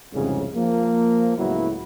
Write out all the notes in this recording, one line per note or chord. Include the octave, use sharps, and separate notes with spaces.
C2 F2 G#2 C#3
F3 A#3
C#2 A2 F#3 B3 E4